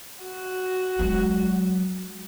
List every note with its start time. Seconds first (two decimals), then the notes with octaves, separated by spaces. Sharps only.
0.24 F#4
0.99 F#3 G#3